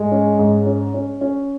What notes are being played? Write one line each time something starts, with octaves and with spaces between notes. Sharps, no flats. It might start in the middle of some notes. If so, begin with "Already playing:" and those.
Already playing: G#2 G#3
C#4
G#2
C#4
C#4
C#4